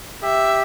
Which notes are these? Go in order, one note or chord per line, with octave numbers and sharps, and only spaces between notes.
G4 E5